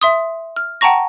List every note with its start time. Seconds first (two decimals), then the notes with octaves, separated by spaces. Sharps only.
0.02 E5 C6 D#6
0.56 F6
0.81 F#5 G5 A5 A#5 C#6 A#6